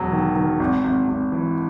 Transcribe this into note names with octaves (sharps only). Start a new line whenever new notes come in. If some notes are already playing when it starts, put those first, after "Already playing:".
Already playing: E1 F#3
D#3
D#3
G#1
G#1
G#1
E3